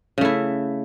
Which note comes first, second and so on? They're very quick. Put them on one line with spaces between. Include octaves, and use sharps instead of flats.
C#3 A3 E4